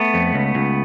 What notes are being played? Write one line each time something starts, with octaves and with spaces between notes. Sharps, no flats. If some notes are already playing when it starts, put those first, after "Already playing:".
Already playing: A3 B3
F2
C#2
C#2